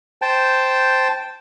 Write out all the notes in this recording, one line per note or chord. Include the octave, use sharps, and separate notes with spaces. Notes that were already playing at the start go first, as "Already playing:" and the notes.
C5 G5 A5